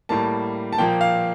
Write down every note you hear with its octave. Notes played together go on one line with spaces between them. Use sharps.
A2 G3 A#3 A5
A5
A#2 F3 A#3 G5
F5